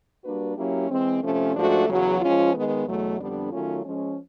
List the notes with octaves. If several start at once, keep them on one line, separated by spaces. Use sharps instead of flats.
G3 A#3 D4 F#4 B4
F#3 A#3 C#4 E4 G4
E3 G#3 C4
C3 F3 A3 C#4
G#2 F3 A3 D4 F#4
E2 C#3 F#3
F3 G#3 C#4 F4
D#3 G#3 B3
E2 B2 F#3 A3
F2 D3 G3 B3 D4
D#3 F#3 A3 C#4 F4
F3 G#3 C#4